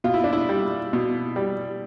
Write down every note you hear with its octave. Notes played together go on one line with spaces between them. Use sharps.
B2 F4
E4
D4
E4
G3
B2
G3